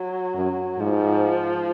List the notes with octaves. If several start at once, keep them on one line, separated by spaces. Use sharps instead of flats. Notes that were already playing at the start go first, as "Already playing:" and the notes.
Already playing: F#3
F#2
G#2 F3